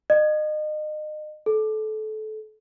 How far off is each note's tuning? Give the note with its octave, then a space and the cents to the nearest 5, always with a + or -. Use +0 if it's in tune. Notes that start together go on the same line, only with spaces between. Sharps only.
D#5 -30
A4 -25